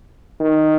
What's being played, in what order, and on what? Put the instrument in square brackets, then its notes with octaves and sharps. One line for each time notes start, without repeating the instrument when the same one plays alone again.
[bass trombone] D#3